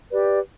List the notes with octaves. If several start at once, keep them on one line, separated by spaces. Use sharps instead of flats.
G4 B4 D5